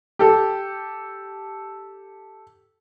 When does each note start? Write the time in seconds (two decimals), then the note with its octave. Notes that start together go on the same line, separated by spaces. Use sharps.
0.19 G4 A4